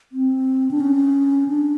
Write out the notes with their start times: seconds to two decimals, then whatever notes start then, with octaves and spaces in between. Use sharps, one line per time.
0.12 C4
0.71 D4
0.81 C#4
1.48 D4